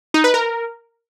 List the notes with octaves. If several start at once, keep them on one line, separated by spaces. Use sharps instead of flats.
D#4
B4
A#4